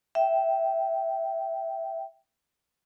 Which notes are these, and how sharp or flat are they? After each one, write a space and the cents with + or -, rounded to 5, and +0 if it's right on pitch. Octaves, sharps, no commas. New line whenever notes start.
E5 +0 G5 -15